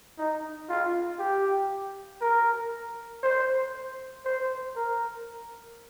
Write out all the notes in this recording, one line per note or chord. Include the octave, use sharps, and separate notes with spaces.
D#4
F4
G4
A#4
C5
C5
A#4